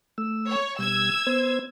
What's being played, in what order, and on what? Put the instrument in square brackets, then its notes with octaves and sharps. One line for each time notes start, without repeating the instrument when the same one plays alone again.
[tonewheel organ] A3 E6
[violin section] C#5
[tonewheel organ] B2 G3 [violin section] E6 G#6
[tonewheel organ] B3 C5